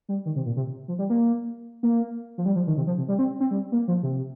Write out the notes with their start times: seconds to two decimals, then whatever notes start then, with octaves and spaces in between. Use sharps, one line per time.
0.09 G3
0.26 D#3
0.36 C3
0.46 A#2
0.56 C3
0.88 F3
0.99 G3
1.10 A#3
1.83 A#3
2.38 F3
2.46 G3
2.56 F3
2.67 D#3
2.77 C3
2.87 F3
2.98 C3
3.08 G3
3.19 C4
3.40 C4
3.51 G3
3.72 A#3
3.88 F3
4.03 C3